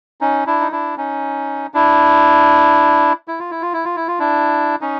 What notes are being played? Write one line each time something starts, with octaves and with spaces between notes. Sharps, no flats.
C#4 D#4
D4 E4
D#4
D4 E4
C#4 D#4
D4 E4
E4
F4
E4
F4
E4
F4
E4
F4
D4 E4
C#4 D#4